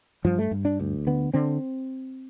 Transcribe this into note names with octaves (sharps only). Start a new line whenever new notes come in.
G2 F3
A3
G2
D4
D2
D3 B3
D3 C4